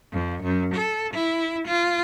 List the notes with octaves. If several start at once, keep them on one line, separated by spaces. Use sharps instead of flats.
F2
F#2
A4
E4
F4